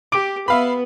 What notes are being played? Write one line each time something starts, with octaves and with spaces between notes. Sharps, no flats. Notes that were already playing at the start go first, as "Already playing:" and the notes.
G4 D6 D7
B3 B4 E5 F5 B5